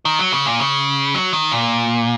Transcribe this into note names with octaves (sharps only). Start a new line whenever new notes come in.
D#3
F#3
C#3
A#2
C#3
F#3
D#3
A#2